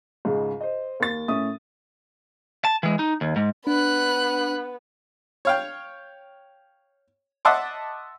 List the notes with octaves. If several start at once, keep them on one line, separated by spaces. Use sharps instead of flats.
C#2 G#2 C#3
C5 D#5
D#2 A6
A2 C#4 E5 D#6
A5
E3 G#3
D#4
D#2
G#2
B3 D4 B5 F#6
C#5 F5 G5
D#5 E5 F#5 A5 C6 D6